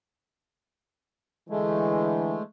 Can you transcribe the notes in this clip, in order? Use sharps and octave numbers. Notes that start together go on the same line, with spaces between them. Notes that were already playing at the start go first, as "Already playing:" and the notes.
D3 E3 G#3 A3